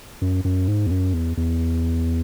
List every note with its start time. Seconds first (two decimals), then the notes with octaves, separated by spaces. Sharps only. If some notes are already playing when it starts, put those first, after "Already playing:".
0.22 F#2
0.45 F#2
0.68 G#2
0.87 E2
0.91 F#2
1.13 E2
1.37 E2